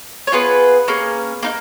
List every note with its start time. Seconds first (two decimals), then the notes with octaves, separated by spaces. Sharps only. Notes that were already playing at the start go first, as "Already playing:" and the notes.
0.27 C#5
0.32 B3 F4 G#4 B4
0.88 A#3 C#4 G#4
1.43 A#3 D#4